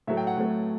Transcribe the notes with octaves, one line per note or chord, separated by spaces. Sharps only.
A2 F#3 A3 E5
G5
F#5
A2 F#3 A3